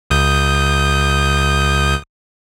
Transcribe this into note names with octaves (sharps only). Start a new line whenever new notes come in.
C#2 D#6 G6